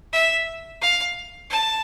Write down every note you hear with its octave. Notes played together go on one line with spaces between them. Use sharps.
E5
F5
A5